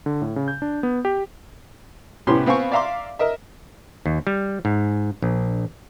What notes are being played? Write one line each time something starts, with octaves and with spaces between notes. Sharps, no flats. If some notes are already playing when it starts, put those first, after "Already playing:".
D3
A2
C#3
G6
D4
B3
G4
C2 A2 B3 C#4 G4 C6
B3 C4 F5 G#5 C#6
D5 E5 F5 A#5 C6 D6
A#4 D#5 E5
D#2
G3
G#2
A#1